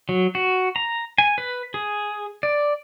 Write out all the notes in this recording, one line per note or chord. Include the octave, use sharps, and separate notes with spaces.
F#3
F#4
A#5
G#5
B4
G#4
D5